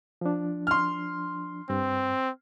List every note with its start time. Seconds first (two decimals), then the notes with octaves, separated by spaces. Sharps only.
0.21 F3 D4
0.67 C6 F6
1.70 G2 C4